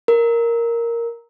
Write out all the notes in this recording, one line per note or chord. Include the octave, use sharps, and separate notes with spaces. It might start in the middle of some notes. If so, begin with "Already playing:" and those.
A#4